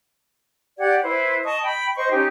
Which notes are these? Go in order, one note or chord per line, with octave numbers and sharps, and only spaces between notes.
G4 D5 F#5 G#6
E4 B4 C5
D#5 A5 C#6 D#6
G5 B5
C5 D#5 C#6
C#4 D#4 G4